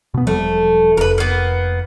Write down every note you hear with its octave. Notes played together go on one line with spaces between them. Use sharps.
B2 B3
E1 F3 G3 A3
F1 A#4 B4
A#3 B3